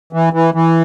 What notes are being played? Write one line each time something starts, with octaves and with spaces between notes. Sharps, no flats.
E3
E3
E3